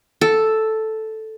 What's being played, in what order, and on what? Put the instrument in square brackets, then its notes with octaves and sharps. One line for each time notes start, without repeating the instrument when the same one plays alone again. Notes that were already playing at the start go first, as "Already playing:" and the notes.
[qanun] A4